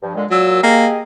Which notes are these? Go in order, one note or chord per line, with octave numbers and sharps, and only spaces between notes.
G2 F3
A#2 D3 G#3
A#2 F#3 E6
A#3 G4 G#4 D#5